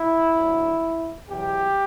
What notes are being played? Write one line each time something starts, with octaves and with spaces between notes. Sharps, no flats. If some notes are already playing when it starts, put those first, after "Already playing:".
Already playing: E4
D2 D3 F#3
E2 B2 F#3 G4